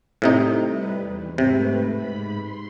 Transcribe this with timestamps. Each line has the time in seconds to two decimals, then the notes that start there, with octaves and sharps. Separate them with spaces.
0.22 A2 C3 D#4
0.65 G3 B4
1.00 E2
1.38 G#2 C3 A3 B4
1.90 G#2 B5
2.39 C6